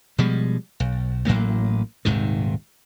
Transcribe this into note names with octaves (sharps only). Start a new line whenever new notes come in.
B2 F3 G3 G#3
B1
A1 A2 F#3 A#3
D#1 G#2 C3 D#3